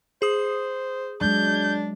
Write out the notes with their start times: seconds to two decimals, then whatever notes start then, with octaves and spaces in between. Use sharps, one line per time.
0.22 G#4 C5 D#6
1.21 F#3 G#3 D4 G6